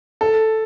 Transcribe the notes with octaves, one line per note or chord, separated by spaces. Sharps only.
A4